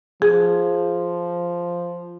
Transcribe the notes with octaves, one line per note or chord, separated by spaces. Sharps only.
F3 G#4